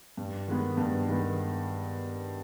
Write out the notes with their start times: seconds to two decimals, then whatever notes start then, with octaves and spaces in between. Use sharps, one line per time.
0.17 G2
0.47 D#3 G#3 B3
0.77 G2
1.08 D#3 G#3 B3